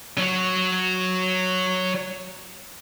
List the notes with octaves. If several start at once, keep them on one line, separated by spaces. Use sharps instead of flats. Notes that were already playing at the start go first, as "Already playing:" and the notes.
F#3 F#4